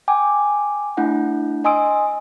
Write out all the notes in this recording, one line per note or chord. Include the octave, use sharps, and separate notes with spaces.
G5 G#5 D6
A3 D4 E4 F#5
D#5 G#5 C6 D#6 E6 D7